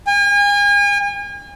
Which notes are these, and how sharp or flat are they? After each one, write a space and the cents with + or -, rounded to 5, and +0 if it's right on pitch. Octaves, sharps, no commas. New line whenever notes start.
G#5 -40